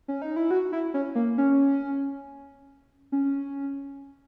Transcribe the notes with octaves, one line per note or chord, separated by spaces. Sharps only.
C#4
D#4
E4
F#4
E4
C#4
A#3
C#4
C#4